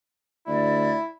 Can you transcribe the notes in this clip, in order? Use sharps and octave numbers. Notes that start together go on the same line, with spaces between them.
D2 E4 D5